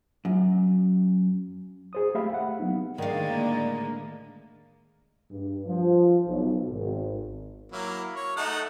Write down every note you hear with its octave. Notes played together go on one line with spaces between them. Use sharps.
F#2
G#4 C5 D#6
A3 G4 E5 F5 B5
F#5
F#3 B3 D#4
A2 D3 D#3 G#3 D5 F5
A#3
G2
F3
B1
G#1
F#3 A#3 E4
C#5
A3 D#4 F#5